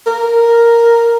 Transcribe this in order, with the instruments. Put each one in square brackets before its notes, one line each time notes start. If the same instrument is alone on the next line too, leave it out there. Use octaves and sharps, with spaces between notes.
[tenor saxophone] A#4